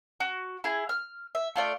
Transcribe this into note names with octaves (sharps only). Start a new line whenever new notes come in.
F#4
E4 G#4
F6
E5
A3 F4 D5